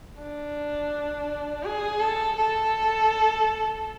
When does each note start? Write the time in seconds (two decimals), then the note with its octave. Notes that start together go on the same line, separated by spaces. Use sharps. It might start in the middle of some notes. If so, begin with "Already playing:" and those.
0.19 D4
1.64 G#4
2.00 A4
2.37 A4